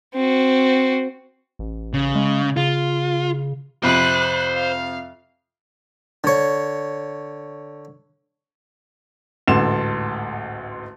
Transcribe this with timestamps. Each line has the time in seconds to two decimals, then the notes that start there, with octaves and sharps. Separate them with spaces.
0.15 C4 F#4
1.59 A1
1.94 C#3
2.15 G#3
2.57 C#3 F4
3.83 F2 C3 C5 B5 F#6
4.56 F5
6.24 D3 C#5
9.48 A1 D2 G#2 D3 C6 E7